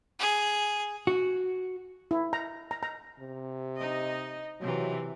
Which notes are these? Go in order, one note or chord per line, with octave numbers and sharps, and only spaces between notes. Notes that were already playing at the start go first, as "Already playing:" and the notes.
G#4
F#4
E4
A#5
A#5
A#5
C3
D#4 D#5
C3 E3 F#3